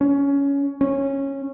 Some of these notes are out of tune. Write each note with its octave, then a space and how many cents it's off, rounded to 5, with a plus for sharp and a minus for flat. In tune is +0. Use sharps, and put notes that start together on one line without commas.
C#4 +15
C#4 -15